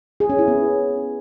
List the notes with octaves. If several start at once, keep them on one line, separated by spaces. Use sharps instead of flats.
G#4
C#4
E4
B3